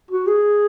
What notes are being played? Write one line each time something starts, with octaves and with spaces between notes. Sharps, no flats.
F#4
G#4